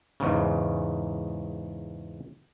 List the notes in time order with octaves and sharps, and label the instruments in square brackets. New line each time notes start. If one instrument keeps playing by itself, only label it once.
[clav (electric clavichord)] E2 G#2 C#3